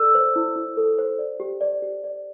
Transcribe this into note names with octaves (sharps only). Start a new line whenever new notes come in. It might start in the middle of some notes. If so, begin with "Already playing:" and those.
Already playing: A4 D5 E6
C5
E4
E4
A4
C5
D5
G4
D5
G4
D5